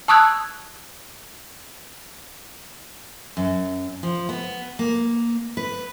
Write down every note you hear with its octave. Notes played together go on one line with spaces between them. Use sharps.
A5 C#6 D#6 E6 F#6 G#6
F#2
F3
B3
A#3
B4